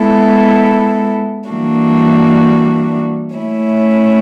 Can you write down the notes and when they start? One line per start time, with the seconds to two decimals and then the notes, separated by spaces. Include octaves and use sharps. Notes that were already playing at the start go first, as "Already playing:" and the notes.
Already playing: G#3 B3 E4 A4
1.49 E3 G3 A#3 D4 F#4
3.36 A3 C#4 E4